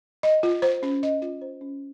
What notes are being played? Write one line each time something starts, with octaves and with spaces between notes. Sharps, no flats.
D#5
F4
C5
C#4
D#5
F4
C5
C#4